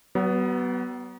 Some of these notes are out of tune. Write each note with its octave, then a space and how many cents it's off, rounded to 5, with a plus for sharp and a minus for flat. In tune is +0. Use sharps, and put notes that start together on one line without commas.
F#3 +40 B3 +0